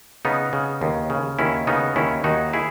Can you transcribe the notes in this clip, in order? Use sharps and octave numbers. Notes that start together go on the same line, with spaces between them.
C#3 B3 D#4
C#3
D#2
C#3
D#2 C#4 E4
C#3 B3 D#4
D#2 C#4 E4
D#2 D#4 F#4
E4 G#4